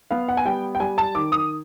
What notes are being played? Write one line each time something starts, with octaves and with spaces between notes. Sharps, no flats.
B3 F5
F#5
G#5
G3 G5
G5
G3 G#5
A5
D#3 D6
D#6